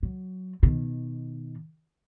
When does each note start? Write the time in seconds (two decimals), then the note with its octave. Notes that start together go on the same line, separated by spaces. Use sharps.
0.03 F#3
0.63 B2 D#3